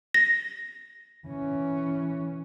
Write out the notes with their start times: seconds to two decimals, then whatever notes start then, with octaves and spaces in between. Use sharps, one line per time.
0.14 A#6
1.27 E3 C#4